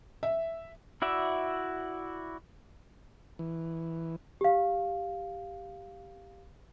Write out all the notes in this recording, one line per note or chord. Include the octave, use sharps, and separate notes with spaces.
E5
E4 F#4 D5 E5
E3
G4 F5